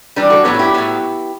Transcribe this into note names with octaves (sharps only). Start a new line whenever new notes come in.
E3 G3 D4 G4 B4
F#4 A4
A2 F#3 B3 G4 B4
F#4
E4 G4
A2 F#3 B3